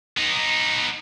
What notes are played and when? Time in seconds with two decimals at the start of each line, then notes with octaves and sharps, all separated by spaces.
0.17 B3 D#4